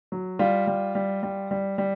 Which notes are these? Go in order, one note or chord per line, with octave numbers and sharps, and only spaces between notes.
F#3
G3 F4
G3
G3
G3
G3
G3